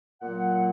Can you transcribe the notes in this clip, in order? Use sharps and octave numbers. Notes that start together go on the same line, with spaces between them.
A#2 F#3 A#3 F#5